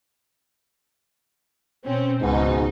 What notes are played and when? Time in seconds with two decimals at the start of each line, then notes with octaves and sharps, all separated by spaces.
1.85 B2 C4 C#4
2.21 C#2 G#2 B2 D#4